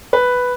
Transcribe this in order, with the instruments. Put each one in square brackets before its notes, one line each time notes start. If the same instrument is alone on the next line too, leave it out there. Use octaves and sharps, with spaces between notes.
[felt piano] B4